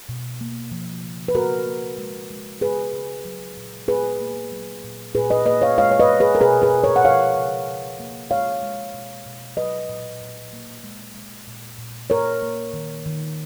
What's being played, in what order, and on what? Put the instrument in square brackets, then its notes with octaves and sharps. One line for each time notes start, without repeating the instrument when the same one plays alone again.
[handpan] B2
A#3
F3
C#3
B4
C#3 F#4 A#4
A#3
G#3
G#3
C#3 G#4 B4
C#3
F#3
A#2
A#2 G#4 B4
A#3
F#3
A#2
A#2 G#4 B4
B4 D#5
A#3 B4 D#5
C#5 F5
G#3 C#5 F5
C#5
B4 D#5
G#3
G#4 B4
A#4
B2 G#4 B4
G#4 B4
B2
A#4 C#5
F#5
F3 C#5 F5
C#3
C#3
A#3
G#3 C#5 F5
G#3
B2
B2
F#3 B4 D#5
A#2
A#2
A#3
G#3
G#3
A#2
A#2
A#3 A#4 C#5
A#3
D#3
D#3